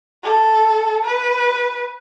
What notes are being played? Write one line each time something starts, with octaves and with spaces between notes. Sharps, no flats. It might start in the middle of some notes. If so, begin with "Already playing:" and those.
A4
B4